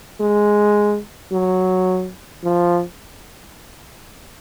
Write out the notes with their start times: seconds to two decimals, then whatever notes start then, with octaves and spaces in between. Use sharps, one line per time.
0.21 G#3
1.32 F#3
2.44 F3